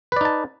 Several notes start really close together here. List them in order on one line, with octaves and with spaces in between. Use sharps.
B4 D5 D#4 A5